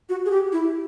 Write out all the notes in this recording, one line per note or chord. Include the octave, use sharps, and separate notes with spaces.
F#4
G#4
G4
E4